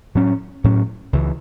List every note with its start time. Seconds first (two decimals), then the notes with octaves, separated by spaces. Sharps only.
0.15 A2 F#3 C#4
0.64 A2 F#3 C#4
1.13 C#2 C#3 E3